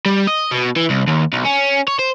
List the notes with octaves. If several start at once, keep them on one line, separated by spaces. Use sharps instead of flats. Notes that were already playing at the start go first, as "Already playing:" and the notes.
G3
D#5
B2
E3
C2
D#2
B1
C#4
C#5
C5